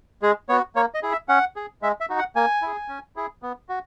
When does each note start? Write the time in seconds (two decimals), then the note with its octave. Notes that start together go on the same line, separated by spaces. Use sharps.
0.22 G#3 G#4
0.49 B3 F#4 C#5
0.76 A#3 C#5
0.94 D#5
1.03 E4 G#4
1.12 E5
1.29 C#4 F#5
1.56 G#4
1.82 G#3 E5
2.00 E5
2.10 D#4 F#4
2.19 F#5
2.36 A#3 G#5
2.62 E4 G#4
2.88 C#4
3.16 E4 G#4
3.42 B3
3.69 F#4